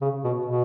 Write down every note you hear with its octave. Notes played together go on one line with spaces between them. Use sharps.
C#3
B2
B2